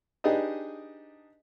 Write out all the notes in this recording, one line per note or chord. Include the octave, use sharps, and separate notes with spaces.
D4 D#4 G4 G#4 B4 D#5